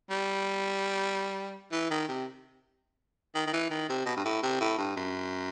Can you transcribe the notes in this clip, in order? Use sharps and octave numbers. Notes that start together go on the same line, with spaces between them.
G3
E3
D#3
C3
D#3
D#3
E3
D#3
C3
B2
G2
A2
C3
A2
G2
F#2